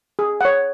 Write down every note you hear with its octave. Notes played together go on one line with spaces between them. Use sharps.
G#4
C#5 F#5